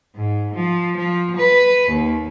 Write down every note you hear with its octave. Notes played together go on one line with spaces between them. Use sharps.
G#2
F3
F3
B4
D#2